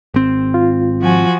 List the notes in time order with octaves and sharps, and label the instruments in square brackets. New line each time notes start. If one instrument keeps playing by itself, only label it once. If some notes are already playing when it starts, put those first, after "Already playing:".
[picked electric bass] G#1 C4
[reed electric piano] F4
[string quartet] F3 F#4 G#5